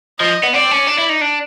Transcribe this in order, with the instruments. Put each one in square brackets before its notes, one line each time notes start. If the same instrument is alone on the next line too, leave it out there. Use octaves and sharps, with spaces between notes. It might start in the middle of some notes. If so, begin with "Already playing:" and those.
[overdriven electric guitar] F3 [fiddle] D#5
[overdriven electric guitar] B3
[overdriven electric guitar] C4 [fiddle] D5
[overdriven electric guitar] C#4
D4
E4
D#4
D4